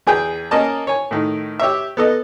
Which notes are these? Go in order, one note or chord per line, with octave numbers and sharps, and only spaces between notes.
E2 G#4 G5
A#3 C#4 A#4 D#5 A5
C#5 G#5
A2 D#3
G4 C#5 E5
B3 A4 D#5